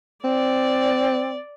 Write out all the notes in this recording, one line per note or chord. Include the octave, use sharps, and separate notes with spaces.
C4 D5